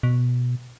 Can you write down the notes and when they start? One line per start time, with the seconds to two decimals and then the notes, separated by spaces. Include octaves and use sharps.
0.03 B2